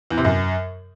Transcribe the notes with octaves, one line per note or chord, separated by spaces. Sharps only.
E2
C3
F#2